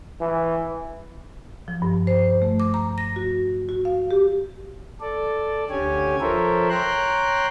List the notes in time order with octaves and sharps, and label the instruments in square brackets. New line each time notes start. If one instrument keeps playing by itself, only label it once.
[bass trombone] E3
[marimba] F3
G2
C5
A3
D6
A#5
A#6
F#4
F#4
F5
G4
[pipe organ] A4 D5
D2 D3 C#4 G4 C#5 G#5
F3 A4 A#4 C5 C#5 E5
C#5 G5 A#5 C6 F#6